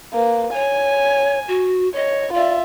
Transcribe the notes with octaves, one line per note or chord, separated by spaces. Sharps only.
A#3 B4
C#5 G#5
F#4
C#5 D#5
F4 D5 E5